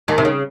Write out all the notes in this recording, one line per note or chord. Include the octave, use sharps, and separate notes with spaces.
D#2 D#3
C3
C#3